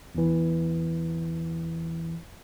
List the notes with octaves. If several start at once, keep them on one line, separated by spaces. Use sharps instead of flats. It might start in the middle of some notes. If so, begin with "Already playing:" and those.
E2 E3